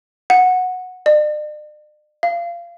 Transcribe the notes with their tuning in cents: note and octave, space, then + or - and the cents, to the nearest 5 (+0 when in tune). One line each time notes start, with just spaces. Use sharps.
F#5 -10
D5 +45
F5 -25